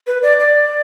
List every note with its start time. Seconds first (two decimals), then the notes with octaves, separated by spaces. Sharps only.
0.07 B4
0.22 D5
0.40 D5